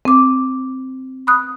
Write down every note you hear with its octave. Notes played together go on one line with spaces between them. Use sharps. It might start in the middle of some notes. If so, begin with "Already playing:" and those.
C4 D6
B5 D#6 F#6